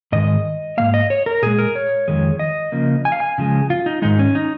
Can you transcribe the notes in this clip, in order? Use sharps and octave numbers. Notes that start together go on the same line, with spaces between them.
G#2 D#3 G#3 D#5
G#2 F3 A#3 F5
D#5
C#5
A#4
A#2 G#3 G#4
A#4
C#5
F2 D#3 G#3
D#5
C#3 F3 A#3
G#5
F5
G#5
C#3 F3 G#3
F4
D#4
G#2 D#3 G#3 D#4
C#4
D#4